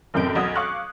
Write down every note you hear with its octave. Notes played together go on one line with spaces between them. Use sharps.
F#1 F#2 A2 C3 G6 D7
F1 B1 F#4 D#6 G#6
F5 C#6 D6 F#6